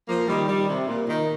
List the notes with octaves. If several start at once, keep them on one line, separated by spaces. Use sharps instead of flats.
F3 A#3
D#3 G3
D#3 G3
C3
A#2
A#2 D#3